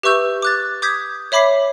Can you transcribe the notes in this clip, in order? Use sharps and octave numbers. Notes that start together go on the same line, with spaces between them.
G4 B4 E5 C#6 E6 G6
D6 F#6 A6
D6 D#6 G6 G#6 B6
C#5 E5 B5 D6 B6 C7